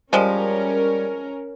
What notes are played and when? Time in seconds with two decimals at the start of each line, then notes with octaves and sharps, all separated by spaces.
0.13 F3 G3 G#3 C#4 A#4